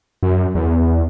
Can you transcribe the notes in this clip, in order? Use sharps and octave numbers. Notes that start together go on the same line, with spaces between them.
F#2
E2